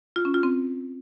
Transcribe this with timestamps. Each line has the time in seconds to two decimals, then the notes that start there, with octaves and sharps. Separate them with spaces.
0.16 F4
0.25 C#4
0.34 F4
0.43 C4